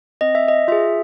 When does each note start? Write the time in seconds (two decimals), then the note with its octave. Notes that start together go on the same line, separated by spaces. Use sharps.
0.21 C4 D#5
0.35 E5
0.48 D#5
0.68 F4 G#4 E5